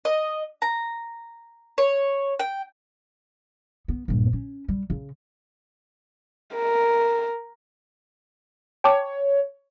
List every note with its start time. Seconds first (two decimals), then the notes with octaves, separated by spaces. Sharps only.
0.05 D#5
0.62 A#5
1.78 C#5
2.39 G5
3.88 B3
4.08 A#1 G2
4.33 C#4
4.68 G3
4.90 C#3
6.55 A#4
8.84 C#5 G5 A5 D6